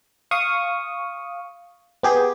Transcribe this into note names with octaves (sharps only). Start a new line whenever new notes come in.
F5 C#6 D#6
B3 G4 G#4